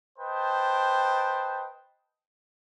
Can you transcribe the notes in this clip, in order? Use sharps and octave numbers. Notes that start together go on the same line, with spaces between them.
B4 C5 D#5 G5 A5